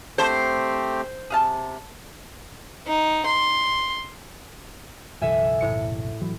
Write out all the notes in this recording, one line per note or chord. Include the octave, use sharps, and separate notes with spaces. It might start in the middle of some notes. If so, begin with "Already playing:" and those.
D3 A3 C4 G4 A4 C5 G5
C3 G#4 F5 A5
D#4
C6
F#1 B1 E3 A4 E5 G#5
A2 C#7
A2 E3 F#3